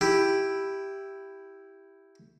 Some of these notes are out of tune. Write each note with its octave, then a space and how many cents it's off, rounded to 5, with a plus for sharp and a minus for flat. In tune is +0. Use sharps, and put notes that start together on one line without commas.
E4 +0 G4 +0